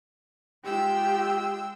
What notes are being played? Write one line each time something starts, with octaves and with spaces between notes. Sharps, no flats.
G#3 F4 G4 G5 E6